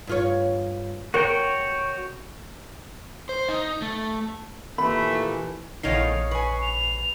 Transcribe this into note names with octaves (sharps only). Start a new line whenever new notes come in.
G2 F4 C#5
F#4 A#4 C#5 G5
C5
D#4
A3
D#2 A#2 E3 A3 B5
A#1 E2 A2 D#3 C#5 D#5 F5 C7
B4 G#5 C#6
F7